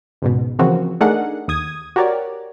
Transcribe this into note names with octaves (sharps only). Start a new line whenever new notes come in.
C#2 G#2 B2
C#3 E3 F3 A#3 C4 F#4
A3 D4 D#4 G#4 A#4 F#5
D#2 D#6 G#6
F#4 G4 A#4 C#5 D5